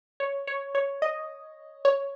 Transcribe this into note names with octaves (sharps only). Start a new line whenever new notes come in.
C#5
C#5
C#5
D#5
C#5